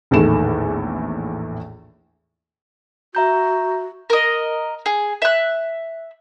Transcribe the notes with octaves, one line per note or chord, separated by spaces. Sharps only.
A#1 E2 A2 D#3 A4 E7
F#4 E5 A#5 G6
A#4 D#5
G#4
E5 F#6